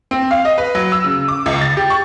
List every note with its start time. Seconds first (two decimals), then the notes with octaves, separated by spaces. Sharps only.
0.11 C4
0.31 F5
0.45 D#5
0.58 B4
0.75 F#3
0.92 E6
1.04 C#3
1.28 D6
1.46 C#2
1.61 A6
1.77 G4
1.90 C#6